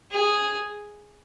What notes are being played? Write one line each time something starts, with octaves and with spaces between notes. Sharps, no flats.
G#4